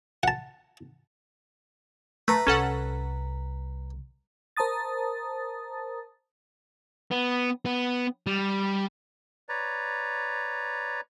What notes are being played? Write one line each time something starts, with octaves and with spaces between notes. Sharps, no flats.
F#5 A5
A3 B4 A#5
C2 C#4 A4 F#5
A#4 C5 A5 A#5 D#6 A6
B3
B3
G3
B4 C#5 D5 A#5